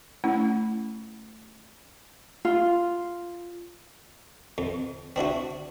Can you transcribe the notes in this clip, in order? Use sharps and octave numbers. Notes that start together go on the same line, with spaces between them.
A3 C#4 E4
F4
F2
C4 D4 E4 F#4